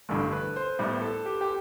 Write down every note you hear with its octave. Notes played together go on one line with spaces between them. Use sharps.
A1 G2 D3 A4
B4
C5
A2 G3 B3 E4
A4
G4
G4